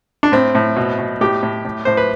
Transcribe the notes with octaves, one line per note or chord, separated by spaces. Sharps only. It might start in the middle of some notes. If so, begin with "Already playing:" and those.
D4
A2 C4
A2
B2
B2
A2 G4
A2
A2
A2 C5
B4